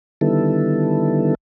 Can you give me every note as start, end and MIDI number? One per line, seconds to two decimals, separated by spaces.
0.21 1.35 50
0.21 1.35 51
0.21 1.35 55
0.21 1.35 59
0.21 1.35 64
0.21 1.35 69